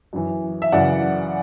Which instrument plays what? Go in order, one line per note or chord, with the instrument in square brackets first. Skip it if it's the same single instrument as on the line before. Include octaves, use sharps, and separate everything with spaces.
[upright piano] F#2 E3
E5
F#2 C#3 E3 D5 F#5